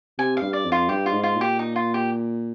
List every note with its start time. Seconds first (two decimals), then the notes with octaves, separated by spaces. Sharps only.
0.19 C3 G#5
0.37 G2 F5
0.53 D5
0.65 F2
0.72 F4
0.89 G2 G4
1.06 F4
1.12 G#2
1.23 F4
1.35 A#2
1.41 G4
1.59 D#4
1.76 F4
1.94 G4